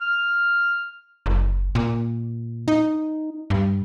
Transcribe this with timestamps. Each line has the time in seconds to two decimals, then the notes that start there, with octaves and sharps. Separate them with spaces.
0.01 F6
1.26 F#1
1.75 A#2
2.68 D#4
3.50 G2